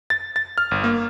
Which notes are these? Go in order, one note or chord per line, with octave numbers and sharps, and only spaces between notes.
A6
A6
F6
G1
A#3